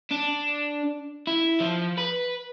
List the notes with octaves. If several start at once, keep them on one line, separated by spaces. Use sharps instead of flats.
D4
E4
F3
B4